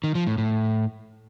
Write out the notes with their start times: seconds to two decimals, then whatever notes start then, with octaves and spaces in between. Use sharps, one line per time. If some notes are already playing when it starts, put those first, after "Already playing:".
0.04 D#3
0.15 F3
0.27 A2
0.38 A2